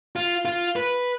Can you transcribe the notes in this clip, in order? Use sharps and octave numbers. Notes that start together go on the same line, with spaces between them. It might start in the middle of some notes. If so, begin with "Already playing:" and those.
F4
F4
B4